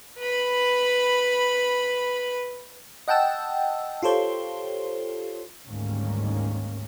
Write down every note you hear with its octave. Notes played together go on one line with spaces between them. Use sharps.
B4 B5
D#5 F#5 G5 A5 E6
F4 G4 A4 C5 C#5
D2 G#2 D#3 G3 A#3 C#4